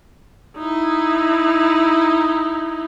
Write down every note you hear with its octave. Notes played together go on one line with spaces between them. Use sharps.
D#4 E4